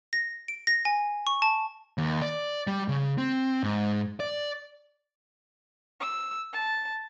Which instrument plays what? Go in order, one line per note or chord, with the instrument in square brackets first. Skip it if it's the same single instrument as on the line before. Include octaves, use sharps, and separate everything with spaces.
[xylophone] A#6
D7
A#6
G#5
C#6
A5
[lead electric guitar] D#2
D5
G3
C#3
C4
G#2
D5
[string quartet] E6
A5